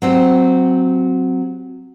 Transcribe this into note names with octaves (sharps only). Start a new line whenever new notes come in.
F#3 C4 G4